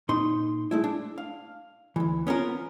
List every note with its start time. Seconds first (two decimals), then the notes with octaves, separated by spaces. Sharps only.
0.09 A#2 D#4 C6
0.71 G#3 A3 E4
0.84 D4
1.18 F5
1.96 D2 E3
2.27 B3 C#4 F4 A#4